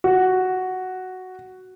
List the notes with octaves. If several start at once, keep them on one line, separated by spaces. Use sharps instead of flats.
F#4